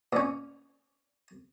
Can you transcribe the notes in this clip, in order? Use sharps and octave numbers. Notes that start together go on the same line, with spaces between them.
A#2 C#4